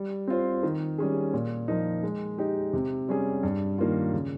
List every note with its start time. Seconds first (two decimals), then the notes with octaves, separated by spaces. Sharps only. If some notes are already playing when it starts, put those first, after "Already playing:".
Already playing: G3
0.27 C4 F4 C5
0.63 D#3
0.98 G3 C#4 G#4
1.33 A#2
1.68 F3 A#3 D#4
2.03 G#3
2.38 D#4 G4
2.73 C3
3.09 G3 C#4 G#4
3.43 G2
3.78 D#3 A#3 F4
4.13 C#3